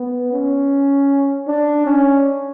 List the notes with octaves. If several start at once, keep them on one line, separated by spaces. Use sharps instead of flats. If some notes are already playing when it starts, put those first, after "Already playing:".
Already playing: B3
C#4
D4
C#4